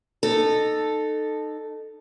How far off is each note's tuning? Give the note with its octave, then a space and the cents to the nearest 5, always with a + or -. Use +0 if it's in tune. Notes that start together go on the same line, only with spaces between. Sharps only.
D#4 -25 A4 +0